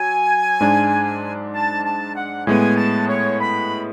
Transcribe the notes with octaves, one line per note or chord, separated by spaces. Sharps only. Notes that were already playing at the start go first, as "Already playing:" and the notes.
Already playing: F#3 G#5
G#2 G#3 D4
A5
A5
F#5
A2 G#3 B3 G#5
A5
C#5
B5